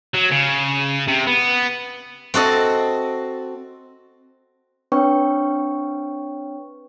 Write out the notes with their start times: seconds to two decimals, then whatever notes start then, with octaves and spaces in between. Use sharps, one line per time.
0.14 F#3
0.31 C#3
1.08 C3
1.27 B3
2.34 C4 F#4 A4 D#5
4.92 C4 D4 B4 C#5 G5 C#6